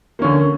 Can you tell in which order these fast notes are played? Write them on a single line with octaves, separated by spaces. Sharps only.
A#3 C#4 D3